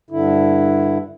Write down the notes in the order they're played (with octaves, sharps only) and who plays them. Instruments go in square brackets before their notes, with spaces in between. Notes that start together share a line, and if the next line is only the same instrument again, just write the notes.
[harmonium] G2 D3 E4